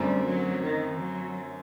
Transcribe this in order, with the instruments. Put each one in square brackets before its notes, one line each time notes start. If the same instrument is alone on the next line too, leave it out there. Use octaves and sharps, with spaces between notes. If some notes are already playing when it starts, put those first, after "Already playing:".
Already playing: [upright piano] F#2 D3 A3 C4 [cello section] G3
[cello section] F#3
D#3
F#3